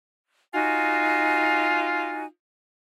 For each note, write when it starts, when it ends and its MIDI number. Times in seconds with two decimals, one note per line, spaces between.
0.54 2.24 63
0.54 2.29 65
0.54 2.24 66
0.54 2.24 80